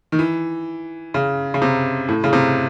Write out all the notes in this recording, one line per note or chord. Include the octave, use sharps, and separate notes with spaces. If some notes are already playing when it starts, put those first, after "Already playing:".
D#3
E3
C#3
C#3
C3
A2
C#3
C3